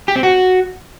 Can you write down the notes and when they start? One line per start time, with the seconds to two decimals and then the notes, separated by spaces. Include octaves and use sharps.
0.08 G4
0.16 C4
0.23 F#4